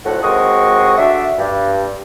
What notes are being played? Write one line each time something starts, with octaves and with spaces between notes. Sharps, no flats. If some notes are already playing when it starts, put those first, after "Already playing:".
D2 A2 F3 A3 F#5
D#2 G#3 C4 F#4 C#6 D#6
A3 D4 F#4 E5
G2